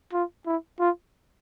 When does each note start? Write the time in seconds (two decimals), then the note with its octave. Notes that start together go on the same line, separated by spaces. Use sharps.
0.13 F4
0.46 E4
0.80 F4